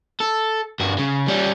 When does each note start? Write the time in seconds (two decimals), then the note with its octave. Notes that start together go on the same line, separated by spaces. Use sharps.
0.20 A4
0.80 G2 F#4
0.99 C#3
1.28 G3 C#4